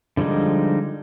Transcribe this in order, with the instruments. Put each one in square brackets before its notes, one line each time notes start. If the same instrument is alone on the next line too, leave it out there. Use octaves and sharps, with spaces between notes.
[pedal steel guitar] D3 F3 G3 G#3 D#4